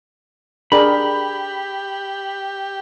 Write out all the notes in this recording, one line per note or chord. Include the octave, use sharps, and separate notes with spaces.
D4 G4 G#4 A#4 B5